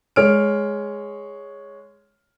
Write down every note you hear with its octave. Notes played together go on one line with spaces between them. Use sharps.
G#3 C#5 F6 D7